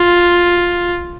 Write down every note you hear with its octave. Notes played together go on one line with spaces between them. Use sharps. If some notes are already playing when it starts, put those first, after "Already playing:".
Already playing: F4